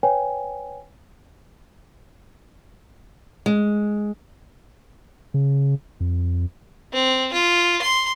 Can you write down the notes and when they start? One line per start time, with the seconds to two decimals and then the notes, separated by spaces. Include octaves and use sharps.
0.03 B4 C#5 G5 G#5
3.46 G#3
5.34 C#3
6.00 F2
6.93 C4
7.33 F4
7.81 C6